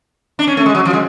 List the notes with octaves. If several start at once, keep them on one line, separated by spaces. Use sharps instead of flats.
D4
C#4
A3
G#3
F#3
F3
G#3